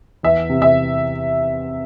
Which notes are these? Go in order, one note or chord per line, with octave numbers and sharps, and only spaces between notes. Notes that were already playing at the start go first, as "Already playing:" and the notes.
E2 E5
C3
E5